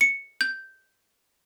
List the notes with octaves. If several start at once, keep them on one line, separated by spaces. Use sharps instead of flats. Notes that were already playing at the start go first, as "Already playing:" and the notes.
C#7
G6